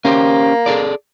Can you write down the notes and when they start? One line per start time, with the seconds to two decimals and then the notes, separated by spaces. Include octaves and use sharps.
0.05 A#3 C#4 G4 C5
0.66 G#4 A4 D5